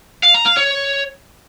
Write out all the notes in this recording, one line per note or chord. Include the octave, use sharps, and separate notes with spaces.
F5
A#5
F5
C#5